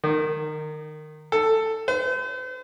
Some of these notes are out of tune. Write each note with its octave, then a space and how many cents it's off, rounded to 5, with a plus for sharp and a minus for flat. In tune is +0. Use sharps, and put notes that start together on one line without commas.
D#3 -25
A4 +10
C5 -45